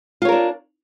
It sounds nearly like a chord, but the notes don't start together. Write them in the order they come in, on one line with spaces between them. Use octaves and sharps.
F4 C#5 A#4 D4